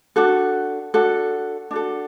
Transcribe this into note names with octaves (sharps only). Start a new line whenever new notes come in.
D4 F#4 A4
D4 F#4 A4
D4 F#4 A4